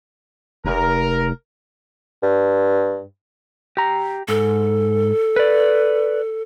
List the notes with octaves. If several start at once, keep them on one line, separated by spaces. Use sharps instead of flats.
F1 A#4
G2
G4 A#5
G#2 A4
B4 D5